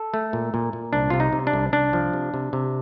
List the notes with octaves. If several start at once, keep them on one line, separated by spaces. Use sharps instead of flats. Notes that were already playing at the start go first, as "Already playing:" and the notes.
Already playing: A4
A3
A#2
A#2
A#2
C2 D4
C3 F4
D#4
C3
D4
C2
C2 D4
F3
C3
C3
C3